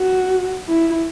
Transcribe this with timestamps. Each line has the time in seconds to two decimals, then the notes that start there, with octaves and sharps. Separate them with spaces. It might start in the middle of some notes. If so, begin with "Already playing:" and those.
Already playing: F#4
0.68 E4